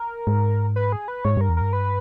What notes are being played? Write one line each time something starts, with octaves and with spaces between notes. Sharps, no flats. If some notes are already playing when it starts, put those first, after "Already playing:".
Already playing: A#4
G#2
B4
G#4
B4
G#2 C#5
G2 A#4
E2
G2 A#4
B4